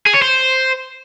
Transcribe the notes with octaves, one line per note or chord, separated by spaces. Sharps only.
G#4
C#5
C5